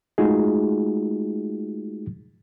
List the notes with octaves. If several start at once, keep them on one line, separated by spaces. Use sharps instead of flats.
G#3 A3 D#4 F4 F#4 G#4